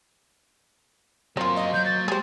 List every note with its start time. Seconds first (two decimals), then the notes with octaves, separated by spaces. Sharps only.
1.37 F#3 A#3 C4 F4 A#4
1.56 D#5
1.74 F#3 G6
1.85 A6
2.08 G#3 G4 G#4 C5